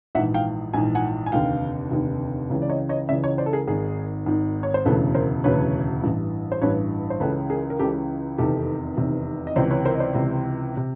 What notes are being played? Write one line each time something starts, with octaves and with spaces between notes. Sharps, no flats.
A#1 G#2 E3 E5 F#5
F5 G5
A#1 G#2 E3 G#5
F#5 G#5
G#5
F1 D#2 D3 F5 G5
F1 D#2 D3
C#2 C#3 E3
D5
C#5 D#5
C#5 D#5
C#2 C#3 E3 D5 E5
C#5 D#5
C5 D5
A4
G#4 A#4
G#1 G#2 D#3 G#4 A#4
G#1 G#2 D#3
C#5
C5
E1 D2 C#3 E3 A4 B4
A#4 C5
E1 D2 C#3 E3 B4 C#5
A1 G2 E3
C5
A1 G2 E3 B4 C#5
C5
C#2 C#3 E3 A4 B4
G#4 A#4
A#4
C#2 C#3 E3 G4 A4
F1 E2 C3 D#3 G4 A4
F1 E2 C3 D#3
D#5
C#2 C3 E3 C5 D5
B4 C#5
A#4 C5
D#5
C5 D5
C#2 C3 E3
C3